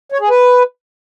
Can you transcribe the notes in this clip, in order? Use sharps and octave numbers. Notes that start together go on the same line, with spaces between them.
C#5
G#4
B4